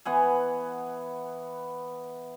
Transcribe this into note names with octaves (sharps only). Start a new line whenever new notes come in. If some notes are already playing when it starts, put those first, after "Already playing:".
E3 B3 F#5 G#5